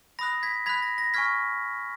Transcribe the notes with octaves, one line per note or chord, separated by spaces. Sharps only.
B5 D#6 F#6 A#6
G#6 B6
B5 F#6 G#6 B6
A#6
A#6
G#5 C#6 F6 G#6 B6